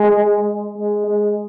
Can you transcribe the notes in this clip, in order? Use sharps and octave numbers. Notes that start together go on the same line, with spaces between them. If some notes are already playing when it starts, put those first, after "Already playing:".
Already playing: G#3
G#3
G#3